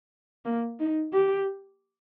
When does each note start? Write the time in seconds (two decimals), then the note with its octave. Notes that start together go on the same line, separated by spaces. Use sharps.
0.45 A#3
0.80 D#4
1.13 G4